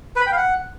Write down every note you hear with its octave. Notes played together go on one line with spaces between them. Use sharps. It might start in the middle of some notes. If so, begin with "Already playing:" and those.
B4
B5
G5
F5
F#5